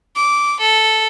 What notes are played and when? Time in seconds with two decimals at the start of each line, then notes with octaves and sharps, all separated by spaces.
0.16 D6
0.61 A4